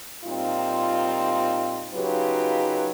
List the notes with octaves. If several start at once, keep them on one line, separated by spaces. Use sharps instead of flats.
A#2 G3 C4 D#4 F4
C#3 F#3 D#4 F4 G4 B4